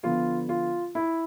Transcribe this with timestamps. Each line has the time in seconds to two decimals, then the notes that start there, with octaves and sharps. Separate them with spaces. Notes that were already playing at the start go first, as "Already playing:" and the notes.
0.03 D3 F3 B3 F4
0.49 F4
0.95 E4